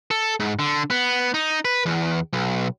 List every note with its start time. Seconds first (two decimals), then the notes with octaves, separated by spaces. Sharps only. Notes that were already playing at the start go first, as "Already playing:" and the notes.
0.11 A4
0.40 G#2
0.59 D3
0.90 B3
1.34 D#4
1.65 B4
1.86 E2
2.33 B1